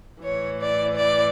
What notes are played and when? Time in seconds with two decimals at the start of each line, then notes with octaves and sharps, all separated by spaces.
0.22 A2 E3 C#5
0.60 D5
0.96 D5